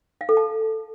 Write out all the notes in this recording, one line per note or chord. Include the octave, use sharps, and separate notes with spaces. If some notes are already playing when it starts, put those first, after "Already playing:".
F5
A4
A5